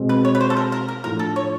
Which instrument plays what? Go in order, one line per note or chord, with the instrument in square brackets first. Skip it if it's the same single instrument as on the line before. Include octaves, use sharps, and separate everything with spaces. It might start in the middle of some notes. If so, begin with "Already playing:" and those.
Already playing: [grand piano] B2 G#3 C4
[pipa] B4
C#5
B4
C5
A4
A#4
A#4
A#4
[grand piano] A2 F3 A3 D4 [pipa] A#4
[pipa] A4
C#5